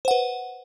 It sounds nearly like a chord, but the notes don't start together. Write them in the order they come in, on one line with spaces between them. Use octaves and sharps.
C5 F#5 B4